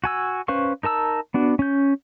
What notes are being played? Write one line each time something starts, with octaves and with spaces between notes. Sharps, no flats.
F#4 G#5 E6
C#4 B4 C5 F5 C#6
D#4 A#4 A5 E6
B3 D4 F#4
C#4 G6